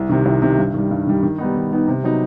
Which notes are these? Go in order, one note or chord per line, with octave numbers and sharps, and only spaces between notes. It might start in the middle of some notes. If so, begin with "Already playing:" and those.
Already playing: C2
C3 D#3
C2
C3 D#3
G2
D#3 G3
G2
D#3 G3
D#3
G3 B3 D#4
D#3
G3 B3 D#4
C3
F#3 B3 D#4